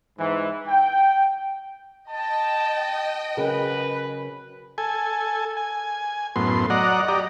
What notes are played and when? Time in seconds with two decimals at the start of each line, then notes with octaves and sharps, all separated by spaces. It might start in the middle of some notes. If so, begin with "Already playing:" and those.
0.18 G#2 E3
0.67 G5
2.10 D#5 G5 A5
3.37 C#3 F#3 A#4 B4
4.78 A4 G#5
5.57 G#5
6.36 F#2 A2 B3 C6
6.70 F#3 D5 D#5 F#5 A#5
7.08 G4 D5 D#5 A#5